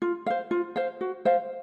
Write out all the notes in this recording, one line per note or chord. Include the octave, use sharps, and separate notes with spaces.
F4
C5 F5
F4
C5 F5
F#4
C5 F5